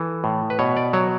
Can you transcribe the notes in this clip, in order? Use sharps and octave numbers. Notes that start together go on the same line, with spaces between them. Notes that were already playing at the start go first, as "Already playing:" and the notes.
Already playing: E3 A4
A2
B4
B2 C#5
D5
F#3 C#5